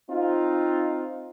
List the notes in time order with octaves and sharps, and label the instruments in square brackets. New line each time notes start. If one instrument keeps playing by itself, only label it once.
[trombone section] C4 D#4 F4